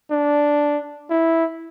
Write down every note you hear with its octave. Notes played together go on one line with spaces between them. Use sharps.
D4
E4